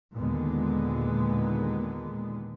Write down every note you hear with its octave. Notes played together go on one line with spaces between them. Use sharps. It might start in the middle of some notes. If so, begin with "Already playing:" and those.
D#2 A#2 D3 D#3 G#3 B3